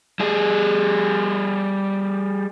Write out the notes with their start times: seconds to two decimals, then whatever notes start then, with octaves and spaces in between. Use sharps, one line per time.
0.20 G3 G#4